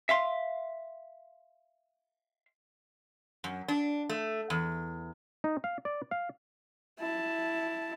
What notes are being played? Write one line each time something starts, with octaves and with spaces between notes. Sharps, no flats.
E5 F5 C6
F#2
D4
A3
E2
D#4
F5
D5
F5
E4 A5